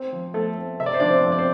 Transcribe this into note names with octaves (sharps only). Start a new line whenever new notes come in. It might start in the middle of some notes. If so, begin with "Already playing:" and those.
Already playing: C4 C5
F3
F3 A3 A4
C4
C3 E5
D5
C5
F3 D4 D5
C4 C5
F2
D5
C4 C5